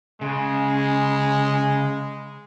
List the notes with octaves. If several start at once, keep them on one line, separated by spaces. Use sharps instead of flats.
C#3 G#3